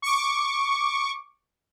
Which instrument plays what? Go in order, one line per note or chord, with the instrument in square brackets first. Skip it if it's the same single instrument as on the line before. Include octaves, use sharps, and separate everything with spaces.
[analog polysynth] C#6 D6